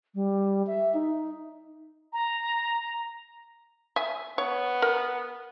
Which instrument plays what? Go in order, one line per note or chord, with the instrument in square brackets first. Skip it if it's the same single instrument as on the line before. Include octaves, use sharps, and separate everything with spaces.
[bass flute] G3
E5
D#4
[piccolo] A#5
[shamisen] E5 G#5
[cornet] B3 [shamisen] C#5
[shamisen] A#4